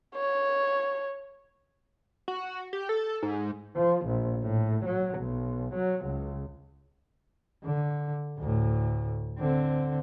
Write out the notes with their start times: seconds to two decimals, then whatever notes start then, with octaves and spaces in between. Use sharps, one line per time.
0.15 C#5
2.28 F#4
2.73 G4
2.89 A4
3.23 G#2
3.76 F3
4.06 A#1
4.42 A2
4.86 F#3
5.19 B1
5.74 F#3
6.06 C#2
7.64 D3
8.38 D2 A2
9.39 D3 C4